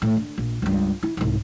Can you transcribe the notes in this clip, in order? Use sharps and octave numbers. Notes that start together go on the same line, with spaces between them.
A2
D3
A#1
C#2 G2
E4
C2 G#2